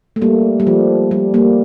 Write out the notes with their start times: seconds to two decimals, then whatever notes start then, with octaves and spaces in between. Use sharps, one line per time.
0.16 A3
0.22 G3 A#3
0.60 G3
0.67 F3
1.11 G3
1.34 G3 A#3